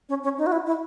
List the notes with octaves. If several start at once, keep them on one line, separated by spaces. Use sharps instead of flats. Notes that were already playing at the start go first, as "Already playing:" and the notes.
C#4
C#4
D#4
F#4
E4
E4